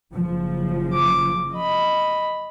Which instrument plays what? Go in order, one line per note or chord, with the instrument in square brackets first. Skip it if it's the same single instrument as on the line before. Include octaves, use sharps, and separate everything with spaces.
[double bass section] F#1 C#3 F3
[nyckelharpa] D6
D#5 B5